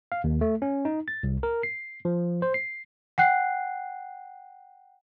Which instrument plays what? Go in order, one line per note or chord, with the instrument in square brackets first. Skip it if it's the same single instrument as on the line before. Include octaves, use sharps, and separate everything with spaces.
[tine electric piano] F5
D#2
A3
C#4
D#4
A6
C2
A#4
C7
F3
C5
C7
[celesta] F#5 G5 F#6 C7